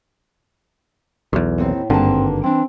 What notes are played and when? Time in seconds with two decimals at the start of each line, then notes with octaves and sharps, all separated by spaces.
1.33 B1 E2
1.58 D#2 A2 C4
1.90 G#1 G2 D3 A#3 C4 A5
2.44 E3 C4 D4